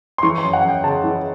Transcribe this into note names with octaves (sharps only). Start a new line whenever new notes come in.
C6
E3 C#6
C6
F#2
F#5
F#2
G5
C#3 A5
E3